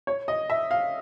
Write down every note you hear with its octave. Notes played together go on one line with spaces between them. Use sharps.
C#5
D#5
E5
F5